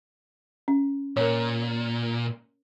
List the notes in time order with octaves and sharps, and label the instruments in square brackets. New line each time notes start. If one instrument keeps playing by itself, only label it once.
[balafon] C#4
[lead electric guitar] A#2 [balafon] A#4 C#5